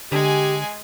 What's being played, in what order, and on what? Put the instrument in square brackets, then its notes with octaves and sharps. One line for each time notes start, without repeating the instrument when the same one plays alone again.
[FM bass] D3 [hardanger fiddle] G#3 G#5 [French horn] G4